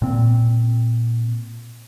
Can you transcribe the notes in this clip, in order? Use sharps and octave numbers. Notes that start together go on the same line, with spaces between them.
A#2 C4